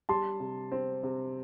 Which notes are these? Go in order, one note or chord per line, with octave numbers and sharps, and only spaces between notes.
G3 A5 C6
C3
C4
C3